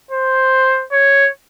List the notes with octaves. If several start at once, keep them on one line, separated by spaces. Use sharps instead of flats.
C5
C#5